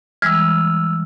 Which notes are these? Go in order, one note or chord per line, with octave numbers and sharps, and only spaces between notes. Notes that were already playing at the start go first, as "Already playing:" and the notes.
E3 G3 G#3 E6 F6